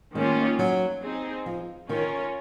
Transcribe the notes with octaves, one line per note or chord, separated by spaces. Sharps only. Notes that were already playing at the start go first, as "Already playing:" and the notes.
D#3 G#3 A#3 C#4 F4
F#3
C4 D#4 G#4
F3
D#3 C#4 F4 A#4 C#5